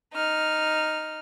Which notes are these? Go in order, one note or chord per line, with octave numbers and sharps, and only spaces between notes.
D#4 F6